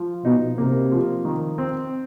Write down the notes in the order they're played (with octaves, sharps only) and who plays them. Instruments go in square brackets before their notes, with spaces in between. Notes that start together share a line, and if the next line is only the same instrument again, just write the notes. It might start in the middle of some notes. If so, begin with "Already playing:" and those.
Already playing: [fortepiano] F3
[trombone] B2 [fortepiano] D#4
[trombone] C3 [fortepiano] A#3
[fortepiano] F3
D#3
C4